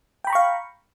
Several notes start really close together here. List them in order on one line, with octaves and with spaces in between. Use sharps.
G5 B5 A#5 C#6 F5